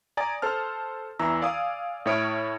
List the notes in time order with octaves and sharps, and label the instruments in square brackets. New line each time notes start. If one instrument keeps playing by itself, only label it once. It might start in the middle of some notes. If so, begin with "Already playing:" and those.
[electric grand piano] D5 G#5 A#5 D#6 A6
A4 C5 A5 F6
E2 E3 A#5 E6
D5 F5 G#5 D#6
A2 E4 C#5 D#6 F6 D7